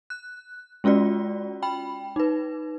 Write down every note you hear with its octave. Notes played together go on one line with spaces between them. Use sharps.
F#6
G#3 C#4 F4 F#4 D5
G5 B5
D#4 B4